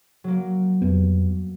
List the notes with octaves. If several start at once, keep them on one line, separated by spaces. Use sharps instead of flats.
F#3 A#3
F2 G3 B3